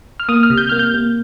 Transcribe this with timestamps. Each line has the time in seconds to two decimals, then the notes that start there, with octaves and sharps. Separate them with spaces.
0.20 F6
0.29 A#3 D#6
0.43 F6
0.50 C3
0.58 G6
0.69 A#3 F6
0.79 G6
0.94 A#3